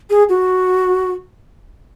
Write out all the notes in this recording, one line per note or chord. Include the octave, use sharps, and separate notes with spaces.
G#4
F#4